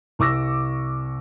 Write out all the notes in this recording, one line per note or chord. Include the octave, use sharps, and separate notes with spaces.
C2 C#6 D6 E6 A#6